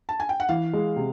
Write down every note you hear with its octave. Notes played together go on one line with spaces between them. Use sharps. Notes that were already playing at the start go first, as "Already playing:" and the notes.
A5
G#5
G5
F#5
E3 F5
G#3
C3